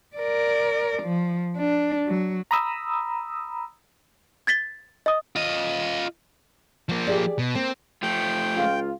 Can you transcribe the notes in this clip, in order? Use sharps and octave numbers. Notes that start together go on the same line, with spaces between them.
A#4 D5
F3
D4
F#3
A#5 B5 D#6 E6
G#6 A6 B6 G7
D#5 D#6
F4 D#5
F3 A#3
G4 G#4 D5
B2
A#3 C4
F3 A3 G5
C#2 F4